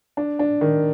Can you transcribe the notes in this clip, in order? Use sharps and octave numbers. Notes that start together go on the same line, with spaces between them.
D4
D4
D#3